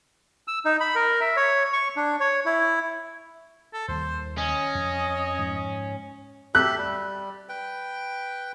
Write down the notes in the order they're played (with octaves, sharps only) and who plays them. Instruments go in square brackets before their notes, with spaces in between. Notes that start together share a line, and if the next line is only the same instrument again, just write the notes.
[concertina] E6
D#4
B5
A#4
E5
C#5
C#6
D4
C#5
E4
[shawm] A4
[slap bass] D#2 G3 A#3 [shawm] C5
[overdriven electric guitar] C#4 [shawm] D#5
[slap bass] F2
G#2 F3
[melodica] G4 A4 E5 [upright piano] F#6
[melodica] G3
B4 G5